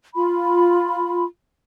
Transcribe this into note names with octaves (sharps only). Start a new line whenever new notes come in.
F4 B5